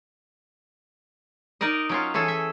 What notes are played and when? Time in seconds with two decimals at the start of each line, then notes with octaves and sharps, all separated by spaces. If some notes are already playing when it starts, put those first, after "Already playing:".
1.61 D#4 A#4 D5 D#5
1.89 F#3 C#4 F4
2.14 E3 C#4 G#4 A4
2.28 E5